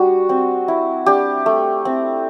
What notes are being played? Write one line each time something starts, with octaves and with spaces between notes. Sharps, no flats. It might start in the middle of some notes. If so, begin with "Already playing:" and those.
Already playing: G3 D4 F#4
C4
E4
D4 G4
A3
C4